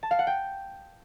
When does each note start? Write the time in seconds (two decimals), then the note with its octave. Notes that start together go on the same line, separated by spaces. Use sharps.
0.03 A5
0.11 F5
0.19 F#5
0.27 G5